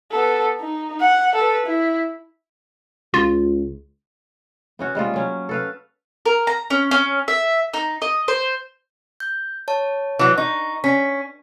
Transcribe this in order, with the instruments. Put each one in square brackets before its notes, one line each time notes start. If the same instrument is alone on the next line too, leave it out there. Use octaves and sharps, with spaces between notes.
[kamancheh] B3 A4
D#4
F#5
A4 B4
E4
[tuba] C#2 [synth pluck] F4
[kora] B3 C#4 F#4
G3 G#3 A#3 F4
F#3 C#4
A4 B4 F5
[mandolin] A#4
A#5
C#4
C#4
E5
D#4
D#5
C5
[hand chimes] G6
C#5 A5
[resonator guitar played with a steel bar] E3 F#3
[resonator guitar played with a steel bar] D#4 [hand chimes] C#6
[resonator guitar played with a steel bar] C#4 [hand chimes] B6